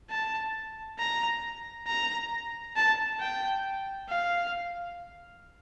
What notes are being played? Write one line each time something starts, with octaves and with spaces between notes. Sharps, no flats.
A5
A#5
A#5
A5
G5
F5